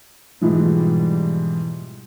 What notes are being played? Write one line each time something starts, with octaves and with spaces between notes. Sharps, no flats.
G#2 B2 E3 F3 G3